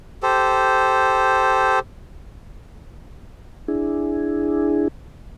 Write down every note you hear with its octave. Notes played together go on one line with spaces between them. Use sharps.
G4 A4 C5
D4 E4 G#4